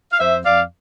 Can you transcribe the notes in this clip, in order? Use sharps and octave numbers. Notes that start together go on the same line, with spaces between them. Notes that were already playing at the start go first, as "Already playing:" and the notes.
F5
F2 C5 E5
F2 D5 F5